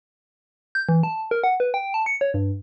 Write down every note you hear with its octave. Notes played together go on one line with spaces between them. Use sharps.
G6
E3
A5
A#4
F#5
B4
G5
A5
C#7
C#5
G2